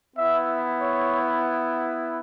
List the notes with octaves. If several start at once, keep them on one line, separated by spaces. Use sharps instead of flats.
B3 E4 E5
C#5